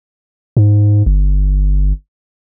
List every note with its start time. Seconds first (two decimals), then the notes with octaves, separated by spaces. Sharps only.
0.57 G#2
1.06 G1